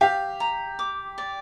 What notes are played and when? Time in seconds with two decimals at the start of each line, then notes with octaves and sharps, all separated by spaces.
0.01 G4 F5
0.40 A#5
0.79 D6
1.18 D5